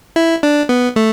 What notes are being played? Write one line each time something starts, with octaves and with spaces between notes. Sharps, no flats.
E4
D4
B3
A3